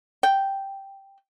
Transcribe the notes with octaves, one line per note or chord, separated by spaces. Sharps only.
G5